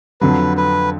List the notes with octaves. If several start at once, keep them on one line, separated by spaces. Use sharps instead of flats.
F2 D3 F#3 B4
B4